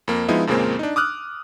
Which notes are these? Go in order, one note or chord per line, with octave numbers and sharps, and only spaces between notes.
F2 A#3
F3 G#3 B3 D#4 E4
F2 A#2 C#3 G#3 A#3 C4
D4 D#4
D6 D#6 F6 F#6